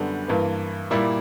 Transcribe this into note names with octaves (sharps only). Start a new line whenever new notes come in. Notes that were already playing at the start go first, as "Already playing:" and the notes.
Already playing: F#2 D3 G3 B3
G2 E3 A#3
A#2 G3 A#3 E4